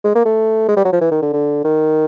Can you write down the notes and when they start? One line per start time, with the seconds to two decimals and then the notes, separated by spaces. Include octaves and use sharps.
0.04 G#3
0.15 A#3
0.25 A3
0.69 G#3
0.77 G3
0.85 F#3
0.93 F3
1.01 E3
1.11 D#3
1.22 D3
1.33 D3
1.64 D#3